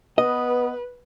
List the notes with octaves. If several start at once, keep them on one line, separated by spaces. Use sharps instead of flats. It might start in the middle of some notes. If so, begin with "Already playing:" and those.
B3 B4 D#5